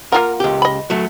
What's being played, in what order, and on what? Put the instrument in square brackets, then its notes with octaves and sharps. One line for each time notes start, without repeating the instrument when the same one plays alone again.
[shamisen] A#3 F4 F#5 [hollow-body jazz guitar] A#4
[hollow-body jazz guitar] C#2 G4
[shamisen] D#5 B5
[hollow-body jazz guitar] F#3 A3